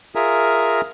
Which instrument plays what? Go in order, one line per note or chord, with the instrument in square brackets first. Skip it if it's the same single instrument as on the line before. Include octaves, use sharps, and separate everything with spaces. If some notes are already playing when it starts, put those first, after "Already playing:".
[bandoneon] F4 G#4 A#4 E5 G#5 A#5